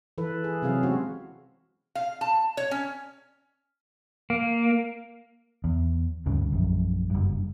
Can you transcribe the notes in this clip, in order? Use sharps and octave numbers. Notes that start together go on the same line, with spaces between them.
E3 A4 B4
G#4
C3 F#3 C4 G#4 F5
G#3 B3 C#4 F#4 G4 C5
F5
A5
C#5
C#4
A#3
E2
D2 G2 C#3
A#1 F#2
F#1 G2